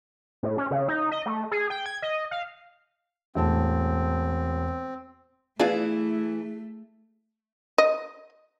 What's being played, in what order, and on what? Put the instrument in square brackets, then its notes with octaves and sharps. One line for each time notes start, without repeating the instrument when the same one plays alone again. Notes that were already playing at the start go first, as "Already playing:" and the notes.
[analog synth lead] A2
C#4
C#3
D#4
D#5
A3
G#4
G5
G#6
D#5
F5
[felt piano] E1 A2 A5 [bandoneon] C4
[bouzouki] E3 E4 [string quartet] A3 [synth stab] B3 D4 F4 [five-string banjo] G#4
[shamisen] D#5